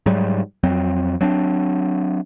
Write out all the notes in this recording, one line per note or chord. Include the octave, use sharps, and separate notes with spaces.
G#2 F#3 G3
F2 F#3 C4
F#3 C4 D4